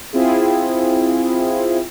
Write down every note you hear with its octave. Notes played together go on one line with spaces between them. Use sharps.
C4 E4 F4 G#4